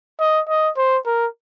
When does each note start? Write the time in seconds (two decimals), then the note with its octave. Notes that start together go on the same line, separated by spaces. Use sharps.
0.20 D#5
0.49 D#5
0.77 C5
1.06 A#4